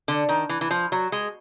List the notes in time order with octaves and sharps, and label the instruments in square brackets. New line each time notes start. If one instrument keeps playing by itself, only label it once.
[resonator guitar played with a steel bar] D3
D#3
E3
E3
F3
F#3
G#3